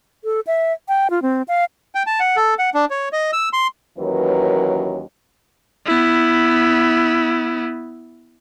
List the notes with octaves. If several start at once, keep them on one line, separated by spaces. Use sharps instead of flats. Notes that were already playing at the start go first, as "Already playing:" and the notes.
A4
E5
G5
F4
C4
F5
G5
A5
F#5
A4
F#5
D4
C#5
D#5
E6
C6
D#2 E3 F#3 C#4 A#4 B4
B3 E4